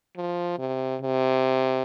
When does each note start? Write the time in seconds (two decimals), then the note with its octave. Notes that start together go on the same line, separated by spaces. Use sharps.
0.17 F3
0.58 C3
1.02 C3